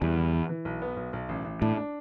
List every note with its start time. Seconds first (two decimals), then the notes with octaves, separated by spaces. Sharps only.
0.02 E2 G3
0.18 E3
0.33 E3
0.49 E3
0.65 B1
0.82 B3
0.97 B1
1.13 B1
1.29 A1
1.45 A1
1.61 A2 D4
1.77 D4